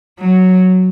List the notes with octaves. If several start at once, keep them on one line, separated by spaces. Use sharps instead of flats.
F#3